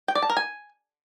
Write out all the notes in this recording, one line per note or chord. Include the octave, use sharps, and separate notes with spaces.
G5
D5
A5
A#4
G#5